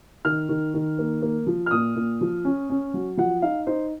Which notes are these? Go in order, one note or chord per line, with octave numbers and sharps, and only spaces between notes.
D#3 F6
D#3
D#3
A#3
A#3
F3
F6
A#2 D#6
A#2
F3
C#4
C#4
F#3
F3 F#5
D#4 F5
D#4 C5